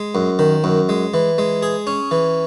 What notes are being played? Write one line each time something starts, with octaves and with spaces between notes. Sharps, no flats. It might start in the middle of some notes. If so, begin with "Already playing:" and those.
Already playing: G#3
F#2
D#3
F#2
G#3
E3
G#3
G#4
C#4
E3